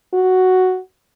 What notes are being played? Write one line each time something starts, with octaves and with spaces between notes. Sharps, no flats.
F#4